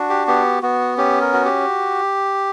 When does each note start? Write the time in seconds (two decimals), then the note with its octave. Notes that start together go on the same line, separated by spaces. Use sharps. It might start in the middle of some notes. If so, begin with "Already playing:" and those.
Already playing: D4 F#4
0.10 G4
0.27 B3 G4
0.63 B3 F#4
0.98 C#4 G4
1.21 A#4
1.33 F#4
1.45 G4